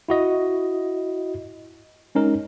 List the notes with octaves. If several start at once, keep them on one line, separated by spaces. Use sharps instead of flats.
E4 F#4 D#5
G#3 C#4 D#4 A#4